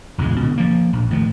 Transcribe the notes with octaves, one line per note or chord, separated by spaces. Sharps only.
E1 C#2 A#2 G#3
B2 D3
F3 A#3
A#1
A2 D#3 F3